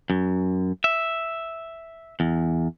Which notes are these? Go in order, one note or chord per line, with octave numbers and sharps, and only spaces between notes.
F#2
E5
E2